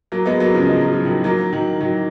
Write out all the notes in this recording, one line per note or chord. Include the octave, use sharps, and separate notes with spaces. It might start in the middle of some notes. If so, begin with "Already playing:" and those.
F#3 A#3
G#3 B3
F#3 A#3
C#3 F3
G#3
F#3
F3
D#3 F#3
F#3 A#3
D#3 F#3
D#3 F#3